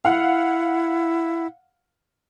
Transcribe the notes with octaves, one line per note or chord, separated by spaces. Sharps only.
E4 F5 F#5